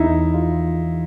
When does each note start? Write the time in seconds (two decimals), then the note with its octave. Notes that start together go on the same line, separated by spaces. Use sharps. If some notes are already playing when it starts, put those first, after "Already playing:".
Already playing: E2 D#4 E4
0.34 F4